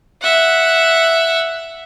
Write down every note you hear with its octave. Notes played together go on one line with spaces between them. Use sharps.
E5 F#5